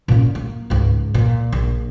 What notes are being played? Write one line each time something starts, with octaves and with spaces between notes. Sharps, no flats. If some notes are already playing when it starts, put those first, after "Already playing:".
A#2 C#4
A#3
C#2 G#2
A#2
A#1